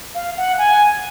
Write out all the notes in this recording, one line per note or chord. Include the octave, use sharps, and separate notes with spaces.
F5
F#5
G#5